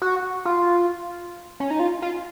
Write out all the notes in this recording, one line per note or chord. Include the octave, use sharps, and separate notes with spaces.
F#4
F4
C#4
D#4
F4
F4